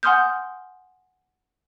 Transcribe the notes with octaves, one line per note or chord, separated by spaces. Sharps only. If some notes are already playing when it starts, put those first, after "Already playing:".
F#5 G#5 C6 D#6 F6 G6